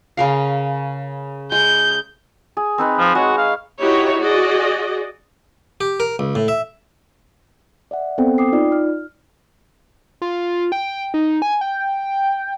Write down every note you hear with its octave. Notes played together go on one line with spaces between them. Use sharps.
C#3 A#4 F5
G#3 G6
G#4
C4 D#4 B4
F3
G#3 F#4 C#5
F5
D#4 E4 F#4 G4 C#5 D#5
F#4 G#4 D5 D#5
G4
A#4
C#2
A2
E5
D5 E5 F#5
B3 C4 A4 C5 G5
G5 D6 D#6 C7
D#4 F4 D5
F6
F4
G5
D#4
G#5
G5